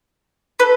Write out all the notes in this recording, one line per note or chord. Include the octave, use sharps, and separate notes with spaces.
A4 B4